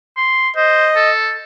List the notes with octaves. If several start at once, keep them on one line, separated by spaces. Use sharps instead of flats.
C6
C5 D#5
A4